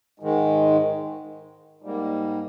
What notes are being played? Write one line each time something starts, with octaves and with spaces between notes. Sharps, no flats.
G#2 D#3 G#3
G#2 G3 A#3